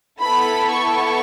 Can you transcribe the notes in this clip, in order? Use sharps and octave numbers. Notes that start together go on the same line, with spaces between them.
B3 E4 A4 B5
C#6